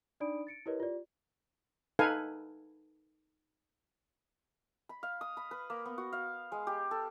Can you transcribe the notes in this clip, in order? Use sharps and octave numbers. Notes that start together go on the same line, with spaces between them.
D4 D#4 D5 B5 D#6 D7
A6 C#7 D7
E4 G4 A#4 B4 C#5 D#5
F4 G4 D5
D#4 A4 B4 F5 G#5
B5
F5
D#6
B5
B4
A#3
B3
F#4
F5
G#3
G4
A4